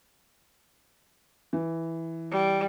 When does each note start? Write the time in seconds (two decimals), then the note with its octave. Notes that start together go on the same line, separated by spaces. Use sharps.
1.53 E3
2.32 G3